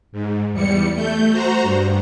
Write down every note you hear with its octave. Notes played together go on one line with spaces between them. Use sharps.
G#2
E2 G3 C#7
A3 G6
F#4 C5 A#5
G2